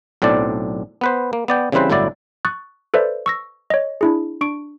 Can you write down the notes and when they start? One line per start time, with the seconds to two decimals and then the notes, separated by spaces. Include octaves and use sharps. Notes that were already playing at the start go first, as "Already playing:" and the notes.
0.22 B1 A2 C4 D4 D5
1.01 B3 B4 C5
1.33 A#3
1.48 B3 D5 G5
1.72 C#3 E3 G3 C4 B4 C5
1.90 G1 A2 F#3 E4 D5
2.45 C#6 D#6 F#6 A6
2.94 A4 B4 C5 D5 E5
3.26 C#6 E6 A#6
3.70 C#5 D#5
4.01 D4 E4 G#4
4.41 D4 C#6 D7